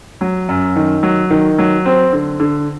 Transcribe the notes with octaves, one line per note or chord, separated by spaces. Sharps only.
F#3
F#2
D#3
F#3
D#3
F#3
C4
D3
D3